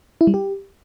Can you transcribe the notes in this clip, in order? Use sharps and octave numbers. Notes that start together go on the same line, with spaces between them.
E4
G3
G4